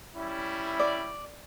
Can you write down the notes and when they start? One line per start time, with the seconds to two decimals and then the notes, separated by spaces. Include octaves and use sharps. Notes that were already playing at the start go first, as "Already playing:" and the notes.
0.16 G3 C#4 E4
0.80 D5